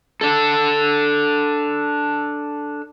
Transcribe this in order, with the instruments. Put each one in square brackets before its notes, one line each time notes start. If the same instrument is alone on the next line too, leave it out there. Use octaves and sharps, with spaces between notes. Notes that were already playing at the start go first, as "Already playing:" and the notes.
[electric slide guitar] D4 A4